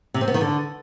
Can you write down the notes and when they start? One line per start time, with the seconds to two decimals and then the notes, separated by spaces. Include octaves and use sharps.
0.14 C3
0.21 C4
0.28 B3
0.34 D#3
0.41 D3